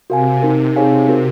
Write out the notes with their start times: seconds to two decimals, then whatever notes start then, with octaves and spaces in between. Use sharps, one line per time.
0.09 C3 F#4 A#4 F5 G#5
0.42 C3 C4 D#4 A#4
0.76 D#4 G#4 C#5 F5 G#5
1.08 C4 F#4 A#4